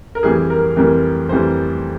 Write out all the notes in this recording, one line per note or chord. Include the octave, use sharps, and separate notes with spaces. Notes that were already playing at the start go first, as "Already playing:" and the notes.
A#4
F2 E3 G3 G#4
A#4
F2 E3 G3 A#4
F2 E3 G3 C5